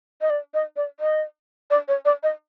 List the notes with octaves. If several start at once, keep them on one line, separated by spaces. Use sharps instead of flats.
D#5
D5
D#5
D5
D#5
D5
C#5
D5
D#5